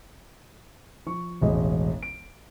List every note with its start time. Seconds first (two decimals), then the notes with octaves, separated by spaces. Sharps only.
1.06 F3 C#6
1.41 E1 A1 G#3 D#5
2.03 D7